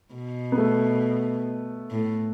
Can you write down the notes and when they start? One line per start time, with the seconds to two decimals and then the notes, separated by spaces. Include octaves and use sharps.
0.14 B2
0.52 B3
0.58 A3
1.91 A2